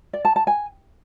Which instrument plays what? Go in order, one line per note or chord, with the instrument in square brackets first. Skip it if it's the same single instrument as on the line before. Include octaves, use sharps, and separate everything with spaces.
[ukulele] D5
A5
A5
G#5